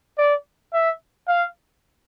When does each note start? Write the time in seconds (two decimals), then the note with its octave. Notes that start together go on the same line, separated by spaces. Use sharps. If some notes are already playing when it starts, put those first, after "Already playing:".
0.18 D5
0.73 E5
1.28 F5